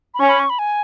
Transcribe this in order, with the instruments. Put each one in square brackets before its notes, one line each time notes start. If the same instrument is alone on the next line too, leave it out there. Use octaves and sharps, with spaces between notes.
[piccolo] B5
[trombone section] C#4 [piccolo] C#6
[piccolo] B5
C#6
B5
G#5